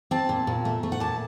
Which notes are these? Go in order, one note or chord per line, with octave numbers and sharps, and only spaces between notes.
C4 A5
A#2
A#2
A3
A3
F#5
A#2 A5